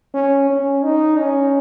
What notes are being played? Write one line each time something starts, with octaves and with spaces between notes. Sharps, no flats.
C#4
C#4
D#4
C#4